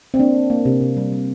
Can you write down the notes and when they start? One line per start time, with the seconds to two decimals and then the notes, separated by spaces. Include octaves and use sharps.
0.14 C4
0.19 A#3 D4
0.35 A#3
0.50 A#3
0.65 C3
0.81 C3
0.97 G3
1.12 G3